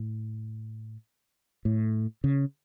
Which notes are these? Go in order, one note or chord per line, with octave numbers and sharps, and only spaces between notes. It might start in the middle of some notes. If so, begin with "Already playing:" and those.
Already playing: A2
A2
C#3